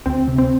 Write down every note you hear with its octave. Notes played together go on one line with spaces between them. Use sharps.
D2 C4
C3
C4